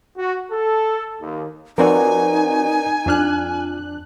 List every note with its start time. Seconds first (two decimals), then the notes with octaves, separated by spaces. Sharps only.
0.18 F#4
0.52 A4
1.21 D#2
1.78 F3 C4 D#4 F#4 A#4 B4 D5 G#5
3.06 F2 D4 F4 F6 F#6